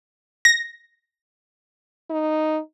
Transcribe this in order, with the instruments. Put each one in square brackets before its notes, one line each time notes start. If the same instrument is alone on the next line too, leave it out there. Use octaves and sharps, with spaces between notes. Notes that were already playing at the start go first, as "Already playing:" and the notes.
[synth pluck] A#6
[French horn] D#4